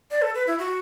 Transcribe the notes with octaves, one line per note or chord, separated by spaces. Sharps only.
D5
A4
B4
E4
F#4